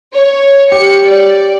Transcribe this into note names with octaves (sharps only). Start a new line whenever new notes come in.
C#5
G4 C#7
D5